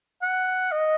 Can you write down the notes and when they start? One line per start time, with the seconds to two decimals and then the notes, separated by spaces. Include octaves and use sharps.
0.22 F#5
0.72 D#5